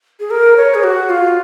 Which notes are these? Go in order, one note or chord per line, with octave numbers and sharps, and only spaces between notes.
G#4
A#4
C#5
G#4
F#4
F4